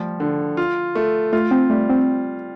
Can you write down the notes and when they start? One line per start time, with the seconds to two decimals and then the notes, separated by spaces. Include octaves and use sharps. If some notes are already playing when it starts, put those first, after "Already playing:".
Already playing: F3 G3 A3
0.20 D3
0.57 F4
0.95 A3
1.33 A3 F4
1.51 C4
1.70 G3 A3
1.90 C4